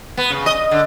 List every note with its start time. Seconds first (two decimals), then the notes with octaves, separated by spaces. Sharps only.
0.17 B3
0.30 C#3
0.46 D#5
0.71 D3